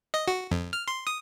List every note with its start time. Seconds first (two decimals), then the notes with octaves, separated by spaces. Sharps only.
0.14 D#5
0.28 F#4
0.51 F2
0.73 F6
0.88 C6
1.07 D#6